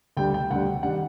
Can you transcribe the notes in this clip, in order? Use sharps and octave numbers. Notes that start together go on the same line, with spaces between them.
D2 D3 G3 G5
G5
D2 D3 G3 F#5
D#3 G3 F#5